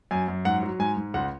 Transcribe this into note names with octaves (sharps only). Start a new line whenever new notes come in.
F#2 G#5
F#2
G#2 F#5
F#3
G#2 G#5
G#2
C#2 F#5